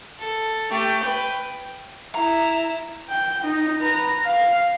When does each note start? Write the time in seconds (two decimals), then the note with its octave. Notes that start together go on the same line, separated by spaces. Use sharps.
0.19 A4
0.71 A3 G4
1.03 B4 G5
2.15 E4 A#5
3.09 G5
3.44 D#4
3.80 B4 A#5
4.26 F5